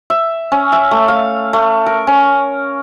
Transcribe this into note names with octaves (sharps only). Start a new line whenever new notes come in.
E5
C#4
E5
A3
F5
A3
A#4
C#4